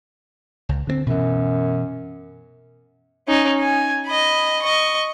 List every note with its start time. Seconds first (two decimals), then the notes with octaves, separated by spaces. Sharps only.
0.69 C#2
0.87 D3 A#3 C4
1.06 F#2 B2 E3
3.28 C#4 D#4
3.60 G#5
4.07 D#5 B5
4.62 D#5 C#6